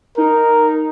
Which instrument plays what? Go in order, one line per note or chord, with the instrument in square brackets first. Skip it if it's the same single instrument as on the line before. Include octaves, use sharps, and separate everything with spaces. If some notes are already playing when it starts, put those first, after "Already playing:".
[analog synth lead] D#4 [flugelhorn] A#4